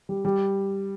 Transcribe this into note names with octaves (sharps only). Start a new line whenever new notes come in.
G3
G3